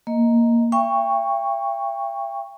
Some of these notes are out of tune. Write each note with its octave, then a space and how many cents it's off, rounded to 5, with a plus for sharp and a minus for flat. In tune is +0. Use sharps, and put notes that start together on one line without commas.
A#3 +0 D#5 +10
E5 +45 G5 +25 C#6 +0